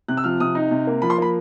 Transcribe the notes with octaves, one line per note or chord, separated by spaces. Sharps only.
C3 F#6
E6
F3 F6
C3 D#6
D#4
C3
A#3
F3 B5
C6
A#3 B5